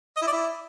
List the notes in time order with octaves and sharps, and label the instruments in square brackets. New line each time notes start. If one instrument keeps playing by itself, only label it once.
[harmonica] D#5
E4
D5
E4